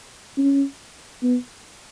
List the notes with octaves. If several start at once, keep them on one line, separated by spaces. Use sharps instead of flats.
C#4
B3